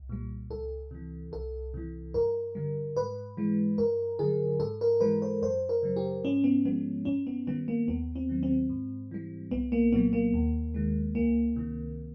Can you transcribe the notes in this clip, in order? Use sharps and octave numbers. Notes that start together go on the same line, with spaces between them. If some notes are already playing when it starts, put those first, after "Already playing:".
Already playing: C2
A#2 G3
C#2 A4
C3 E3
C2 A4
C3 E3
G2 A#4
D3 G3
G#2 B4
E3 G#3
G2 A#4
D3 F#3 G#4
G#2 A4
A#4
E3 G#3 B4
C5
F#2 C5
A#4
C#3 F#3
G4
G#2 C#4
B3
F3 G#3 B3
G2 C#4
B3
D#3 G3 B3
A#3
D#2 B3
C4
D#3 F#3
C4
G#2
E3 G3
C2 B3
A#3
A#2 F#3 B3
A#3
D#2
D#3 G#3
C#2 A#3
C3 D#3